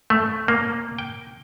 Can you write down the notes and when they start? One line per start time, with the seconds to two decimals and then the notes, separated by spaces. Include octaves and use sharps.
0.10 A3
0.48 A#3
0.99 G5